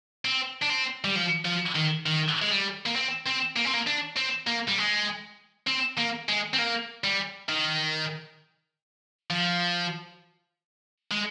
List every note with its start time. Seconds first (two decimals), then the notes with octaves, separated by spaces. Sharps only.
0.25 C4
0.62 D4
0.70 C4
1.04 G3
1.16 F3
1.45 F3
1.75 D#3
2.06 D#3
2.42 G#3
2.51 G3
2.86 A#3
2.96 C4
3.27 C4
3.56 A#3
3.65 C4
3.73 A#3
3.87 D4
4.16 C4
4.47 A#3
4.68 G3
4.78 G#3
5.67 C4
5.98 A#3
6.29 G#3
6.54 C4
6.58 A#3
7.04 G3
7.49 D#3
9.30 F3
11.12 G#3